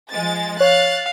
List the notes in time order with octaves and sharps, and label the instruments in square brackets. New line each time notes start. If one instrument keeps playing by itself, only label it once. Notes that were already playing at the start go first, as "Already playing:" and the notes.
[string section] F3 G#3 A6
[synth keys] C#5 [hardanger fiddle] F5 [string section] F#6 A6